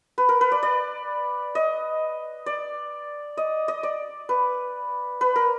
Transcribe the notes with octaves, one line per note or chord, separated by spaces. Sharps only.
B4
A#4
B4
D5
D5
D#5
D5
D#5
D#5
D5
B4
B4
A#4